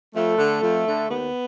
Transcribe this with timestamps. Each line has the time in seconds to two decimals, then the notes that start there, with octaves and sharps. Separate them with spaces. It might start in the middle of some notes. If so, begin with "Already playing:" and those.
0.15 F2 A3
0.38 D3
0.61 F2
0.86 D3
1.09 D#2 B3